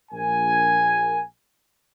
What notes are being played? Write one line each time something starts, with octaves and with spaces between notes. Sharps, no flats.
A#1 A#4 G#5